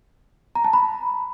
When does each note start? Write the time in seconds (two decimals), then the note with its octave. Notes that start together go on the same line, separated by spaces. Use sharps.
0.55 A#5
0.64 A5
0.73 B5